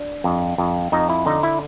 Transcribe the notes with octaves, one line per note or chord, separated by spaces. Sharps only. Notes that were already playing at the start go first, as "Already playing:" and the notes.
Already playing: D4
F2
F2
F2 D#4
E4
D3 D#4
E4